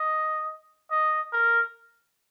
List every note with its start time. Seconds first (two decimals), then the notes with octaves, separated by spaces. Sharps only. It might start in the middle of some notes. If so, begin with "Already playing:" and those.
Already playing: D#5
0.91 D#5
1.33 A#4